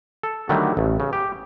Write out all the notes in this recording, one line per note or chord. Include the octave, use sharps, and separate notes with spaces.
A4
D3 D#3 F#3 G3 A3
A1
C#3
G4